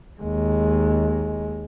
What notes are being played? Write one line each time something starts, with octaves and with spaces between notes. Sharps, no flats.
D#2 G#3